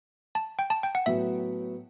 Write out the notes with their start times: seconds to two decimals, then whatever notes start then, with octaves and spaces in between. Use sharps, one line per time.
0.35 A5
0.59 G5
0.70 A5
0.83 G5
0.95 F#5
1.06 A2 F#3 B3 F#4 E5